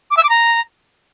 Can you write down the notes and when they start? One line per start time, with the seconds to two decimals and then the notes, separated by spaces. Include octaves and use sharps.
0.11 D6
0.17 E5
0.23 D6
0.29 A#5